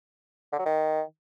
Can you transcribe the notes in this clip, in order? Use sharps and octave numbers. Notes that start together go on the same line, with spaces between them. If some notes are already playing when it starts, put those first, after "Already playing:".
D3
F#3
D#3